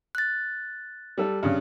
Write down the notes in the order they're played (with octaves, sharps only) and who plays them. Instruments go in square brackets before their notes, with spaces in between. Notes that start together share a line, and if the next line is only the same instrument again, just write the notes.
[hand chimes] F#6 A6
[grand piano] G3 A4
G2 C#3